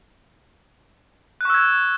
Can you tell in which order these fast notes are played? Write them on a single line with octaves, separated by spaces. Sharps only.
F#6 C#6 E6 G#6